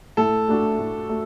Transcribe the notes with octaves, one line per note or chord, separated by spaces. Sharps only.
A2 A4
A3 D4 F#4
A2
A3